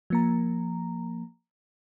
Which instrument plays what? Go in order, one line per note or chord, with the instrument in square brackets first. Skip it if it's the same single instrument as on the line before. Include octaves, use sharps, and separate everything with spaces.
[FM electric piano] F3 A#3 A#5